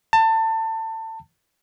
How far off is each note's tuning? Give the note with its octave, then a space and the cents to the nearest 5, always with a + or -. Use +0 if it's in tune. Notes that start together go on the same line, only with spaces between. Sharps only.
A5 +25